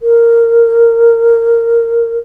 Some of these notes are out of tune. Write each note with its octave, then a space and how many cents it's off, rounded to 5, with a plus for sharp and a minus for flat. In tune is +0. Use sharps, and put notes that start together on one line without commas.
A#4 -10